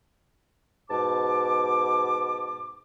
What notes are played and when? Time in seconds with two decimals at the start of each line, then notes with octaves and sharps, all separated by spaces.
0.90 G#2 B2 A5 D6